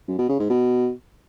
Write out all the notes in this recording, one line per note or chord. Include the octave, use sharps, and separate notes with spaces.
F#2
B2
C#3
G#2
B2